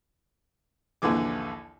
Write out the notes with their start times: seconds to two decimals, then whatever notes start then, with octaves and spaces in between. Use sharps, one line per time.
1.02 A#1 D#2 D3 E3 D6